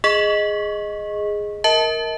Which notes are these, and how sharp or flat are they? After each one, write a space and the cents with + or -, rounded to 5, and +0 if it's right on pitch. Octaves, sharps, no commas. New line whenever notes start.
G#4 +0 D#5 +0 C#6 -20
A#4 -5 D#5 +40 A5 +0